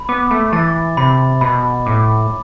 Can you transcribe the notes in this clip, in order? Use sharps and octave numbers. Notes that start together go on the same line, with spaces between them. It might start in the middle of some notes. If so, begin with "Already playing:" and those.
Already playing: B5
B3 D6
A3
E3 A6
C3 B5
B2 B5
A2 D6